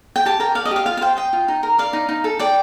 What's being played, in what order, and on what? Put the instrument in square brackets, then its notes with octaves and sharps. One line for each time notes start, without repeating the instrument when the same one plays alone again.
[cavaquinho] G5
G4 A5
A#4 G5
D5 F5
D#5
G4 F5
F4 F5
F5
C5 G5
D#5 G5
F4
D#4
A#4
D5 F5
D#4
D#4
A4
D5 G5